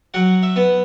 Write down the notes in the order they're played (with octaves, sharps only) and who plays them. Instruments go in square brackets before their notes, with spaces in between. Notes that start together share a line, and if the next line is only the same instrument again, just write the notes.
[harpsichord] F#3 F#5
E5
B3